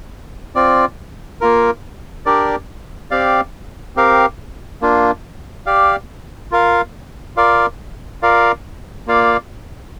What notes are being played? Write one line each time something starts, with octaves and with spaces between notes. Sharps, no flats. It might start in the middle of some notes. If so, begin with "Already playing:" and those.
C4 F4 D5
A#3 F4 A#4
D4 G4 A#4 D5
C4 G4 D5 F5
C4 G4 A#4 F5
A#3 D4 F4
G4 D5 F5
F4 A#4 F5
F4 A#4 D5 F5
F4 A#4 D5 F5
A#3 F4 D5 F5